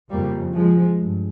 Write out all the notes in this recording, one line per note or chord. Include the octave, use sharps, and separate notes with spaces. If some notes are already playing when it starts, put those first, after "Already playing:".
F2 C#3 G3 A#3
F3 G#3
G2